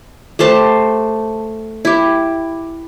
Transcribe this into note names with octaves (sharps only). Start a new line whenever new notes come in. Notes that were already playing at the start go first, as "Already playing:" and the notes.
A3 G4 C5 A5
E4 G4